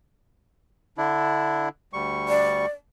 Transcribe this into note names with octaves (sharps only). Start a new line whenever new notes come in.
D3 D4 E4
D2 G3 C#6
D5